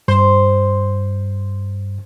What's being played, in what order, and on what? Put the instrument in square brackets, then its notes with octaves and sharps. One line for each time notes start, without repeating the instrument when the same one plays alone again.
[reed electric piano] G2 [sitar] C5